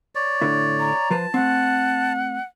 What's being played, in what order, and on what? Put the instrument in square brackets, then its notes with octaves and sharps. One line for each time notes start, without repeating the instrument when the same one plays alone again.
[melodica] C#5 D5
[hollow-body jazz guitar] A2 D3 E4
[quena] A#5
[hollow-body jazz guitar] F3 B4 C5 [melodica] A5
[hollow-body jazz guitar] A3 C4 [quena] F#5